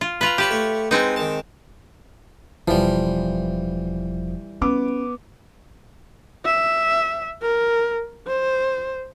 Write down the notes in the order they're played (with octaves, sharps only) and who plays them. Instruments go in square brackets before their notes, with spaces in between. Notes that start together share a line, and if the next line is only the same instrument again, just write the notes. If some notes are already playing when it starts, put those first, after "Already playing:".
[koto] F4
[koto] F4 B4 [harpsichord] G#5 A#5
[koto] G4 B4 [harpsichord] C#5 A5
[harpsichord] A3 C#5
[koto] G#3 C4 D#4 [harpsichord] B4 F#5
[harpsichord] D#3 A5
[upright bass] E1 [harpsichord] E3 G3 [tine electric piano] F3
[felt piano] B3 D6 [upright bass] C#4
[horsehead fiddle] E5
A#4
C5